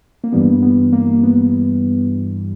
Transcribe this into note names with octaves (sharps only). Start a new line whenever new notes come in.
A#3
G2 E3 G3 B3
B3
A#3
B3